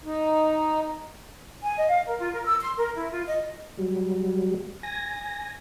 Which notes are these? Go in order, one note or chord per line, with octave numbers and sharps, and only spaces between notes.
D#4
G#5
D#5
F5
A#4
F4
A#4
E6
C6
A#4
E4
F4
D#5
F#3 G3
G#5 A#6